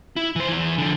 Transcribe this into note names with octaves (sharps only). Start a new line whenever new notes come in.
E4
E3 C5
E2 E3
D3 F3